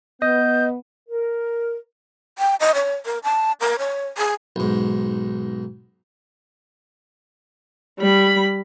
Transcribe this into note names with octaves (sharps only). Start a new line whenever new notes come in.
B3 D#5 G6
A#4
G5
D#5
C#5
A#4
A5
A#4
C#5
G#4
B1 G#2
G3 B5